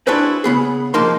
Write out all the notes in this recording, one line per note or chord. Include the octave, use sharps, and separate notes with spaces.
D4 E4 F#4 G#4 B4 C5
C#3 B3 G#4
C2 F3 A#3 D#4 C6